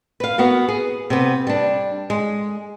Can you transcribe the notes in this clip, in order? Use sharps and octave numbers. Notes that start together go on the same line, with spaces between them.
B4 F5
B3 F#4 A#4
G#4
C3 B3
G3 D4
G#3